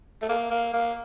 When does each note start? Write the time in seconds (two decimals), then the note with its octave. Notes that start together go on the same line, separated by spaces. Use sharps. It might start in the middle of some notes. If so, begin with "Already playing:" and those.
0.22 A3
0.29 A#3
0.50 A#3
0.73 A#3